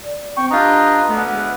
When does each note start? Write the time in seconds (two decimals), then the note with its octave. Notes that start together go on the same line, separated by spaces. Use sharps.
0.03 D5
0.37 C4 G5 C#6
0.51 D4 F4 G4 B4 D#5 A#5
1.07 D2 A3 B3
1.32 G#3